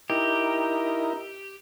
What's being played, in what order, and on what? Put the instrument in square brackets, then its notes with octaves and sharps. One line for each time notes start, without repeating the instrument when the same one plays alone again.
[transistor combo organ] D#4 E4 A#4 [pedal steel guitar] G4